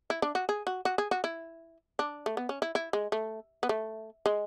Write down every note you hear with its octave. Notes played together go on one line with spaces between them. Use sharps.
E4
D4
F#4
G#4
F#4
F#4
G#4
F#4
E4
D4
A3
B3
C#4
E4
E4
G#3
A3
B3
A3
G#3